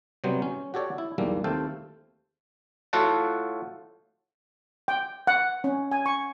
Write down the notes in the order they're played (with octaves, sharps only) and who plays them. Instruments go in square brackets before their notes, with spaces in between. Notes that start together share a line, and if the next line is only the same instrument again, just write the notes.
[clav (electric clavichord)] C3 F#3 G3 B3 C5
C#4
F#4 G4 A4 C#5 D5
E4
B1 E2 G3 A#3
D#2 A3 C4 A4 F5 G5
A2 F4 F#4 A4 F#5 A5
[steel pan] G5
F#5
C#4
G#5
C#6